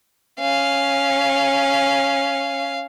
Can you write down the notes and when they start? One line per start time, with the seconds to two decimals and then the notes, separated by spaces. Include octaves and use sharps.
0.40 C#4 F5